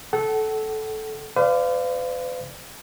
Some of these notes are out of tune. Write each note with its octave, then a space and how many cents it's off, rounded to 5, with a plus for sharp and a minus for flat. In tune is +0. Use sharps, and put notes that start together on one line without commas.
A4 -15 F#5 +35
B4 +45 D5 +0 F5 -10